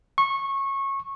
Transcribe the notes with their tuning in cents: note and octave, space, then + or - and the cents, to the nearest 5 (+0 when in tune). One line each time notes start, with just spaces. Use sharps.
C#6 -20